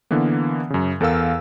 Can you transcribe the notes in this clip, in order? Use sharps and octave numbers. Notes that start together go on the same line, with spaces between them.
D3 E3 A#3 B3
F#2 C#3
E2 A4 A#4 F5 E6